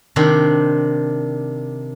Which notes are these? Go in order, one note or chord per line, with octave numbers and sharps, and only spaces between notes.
C3 D#3 D4 C5